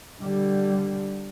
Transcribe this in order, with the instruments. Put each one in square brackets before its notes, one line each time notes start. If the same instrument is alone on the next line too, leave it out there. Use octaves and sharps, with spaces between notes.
[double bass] D3 G3